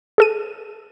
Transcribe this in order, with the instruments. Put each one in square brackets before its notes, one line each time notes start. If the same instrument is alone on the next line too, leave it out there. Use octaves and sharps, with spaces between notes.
[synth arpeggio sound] G#4 A4 D#7